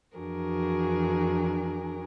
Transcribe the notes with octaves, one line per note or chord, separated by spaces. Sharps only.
F2 E3 D4 F#4 G#4 A#4